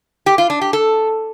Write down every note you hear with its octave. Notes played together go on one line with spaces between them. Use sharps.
G4
F4
D4
G4
A4